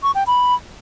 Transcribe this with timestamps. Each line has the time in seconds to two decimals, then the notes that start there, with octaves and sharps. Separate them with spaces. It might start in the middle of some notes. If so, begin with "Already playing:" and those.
0.03 C#6
0.15 G5
0.27 B5